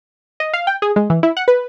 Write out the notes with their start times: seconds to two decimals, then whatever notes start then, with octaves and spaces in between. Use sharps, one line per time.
0.40 D#5
0.53 F5
0.67 G5
0.82 G#4
0.96 G#3
1.10 E3
1.23 E4
1.37 F#5
1.48 B4